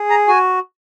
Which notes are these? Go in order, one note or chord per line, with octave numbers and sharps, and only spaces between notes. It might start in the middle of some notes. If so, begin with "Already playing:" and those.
Already playing: G#4
A#5
F#4 G#5